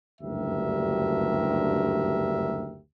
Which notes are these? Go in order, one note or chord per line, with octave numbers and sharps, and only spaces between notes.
F#1 D2 G2 G4 A#4 E5